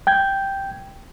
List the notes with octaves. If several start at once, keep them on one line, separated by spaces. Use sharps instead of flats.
G5 G6 G#6